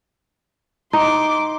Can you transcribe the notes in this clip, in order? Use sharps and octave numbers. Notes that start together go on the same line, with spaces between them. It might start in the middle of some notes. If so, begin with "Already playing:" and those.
D#4 C6 D6